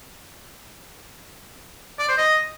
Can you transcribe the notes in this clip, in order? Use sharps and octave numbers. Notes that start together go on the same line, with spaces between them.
D5
C5
D#5